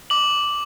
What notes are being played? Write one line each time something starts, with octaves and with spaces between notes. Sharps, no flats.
D6 F#7